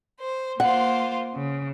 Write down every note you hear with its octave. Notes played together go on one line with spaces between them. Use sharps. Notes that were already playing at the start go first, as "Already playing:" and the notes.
C5
A#3 F4 C5 F#5
C#3